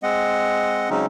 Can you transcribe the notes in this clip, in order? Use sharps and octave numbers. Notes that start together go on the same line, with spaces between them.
G#3 C4 D#5 F#5
C#3 F#3 G#3 C4 C#4 D#4